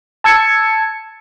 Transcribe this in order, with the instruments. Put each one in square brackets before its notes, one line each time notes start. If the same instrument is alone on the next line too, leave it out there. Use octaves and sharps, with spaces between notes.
[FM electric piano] A5 E6 G#6 C#7